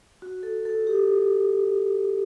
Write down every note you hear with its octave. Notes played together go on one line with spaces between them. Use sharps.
F#4
A4
A4
G4